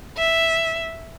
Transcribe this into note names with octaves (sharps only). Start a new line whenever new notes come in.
E5